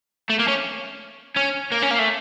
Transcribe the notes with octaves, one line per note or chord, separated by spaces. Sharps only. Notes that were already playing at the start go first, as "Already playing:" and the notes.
A3
A#3
C#4
C#4
A#3
C#4
A#3
A3